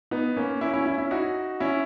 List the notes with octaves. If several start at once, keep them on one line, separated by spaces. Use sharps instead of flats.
B3 D#4
A#3 C#4
C#4 E4
C#4 E4
C#4 E4
C#4 E4
D#4 F#4
C#4 E4